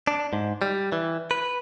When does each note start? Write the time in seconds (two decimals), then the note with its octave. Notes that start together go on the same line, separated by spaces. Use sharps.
0.07 D4
0.33 G#2
0.62 G3
0.92 E3
1.31 B4